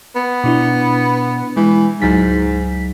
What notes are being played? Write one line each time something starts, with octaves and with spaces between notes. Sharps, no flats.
B3
B2 D4 E4
E3 G#3
C#2 G#2 F#3 B6